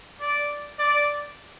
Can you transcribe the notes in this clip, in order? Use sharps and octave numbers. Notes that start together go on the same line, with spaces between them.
D5
D5